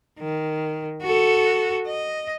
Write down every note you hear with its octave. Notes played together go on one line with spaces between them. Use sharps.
D#3
F#4 A4
D#5